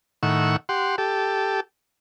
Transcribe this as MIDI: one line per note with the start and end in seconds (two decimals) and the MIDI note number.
0.23 0.56 45
0.23 0.56 51
0.23 0.56 78
0.23 0.56 85
0.23 0.56 88
0.69 0.96 67
0.69 0.96 78
0.69 0.96 84
0.98 1.60 67
0.98 1.60 69